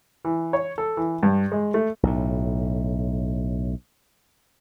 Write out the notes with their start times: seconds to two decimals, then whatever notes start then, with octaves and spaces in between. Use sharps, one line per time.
0.25 E3
0.53 C#5
0.78 A4
0.97 E3
1.23 G2
1.52 G#3
1.74 A3
2.03 B1 A2